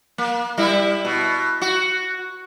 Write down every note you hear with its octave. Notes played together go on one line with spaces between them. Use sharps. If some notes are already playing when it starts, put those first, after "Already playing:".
A#3
G3 E4
B2
F#4